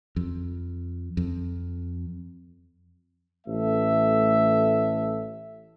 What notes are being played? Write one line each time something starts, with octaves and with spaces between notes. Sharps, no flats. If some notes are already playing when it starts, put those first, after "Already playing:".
F2
F2
A1 A3 A4 E5